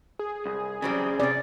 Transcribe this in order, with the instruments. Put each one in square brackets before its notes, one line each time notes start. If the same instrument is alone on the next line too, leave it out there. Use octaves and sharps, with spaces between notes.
[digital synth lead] G#4
[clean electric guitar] C2
[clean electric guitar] C#3 C4 [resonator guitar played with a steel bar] E3 F#3 G3
[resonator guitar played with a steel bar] C3 C#4 [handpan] D5